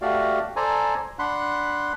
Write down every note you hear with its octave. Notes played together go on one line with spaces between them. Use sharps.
A3 F#4 G4 D5 F5
A4 C5 D5 G#5 A#5
D4 F#5 B5 C6 F#6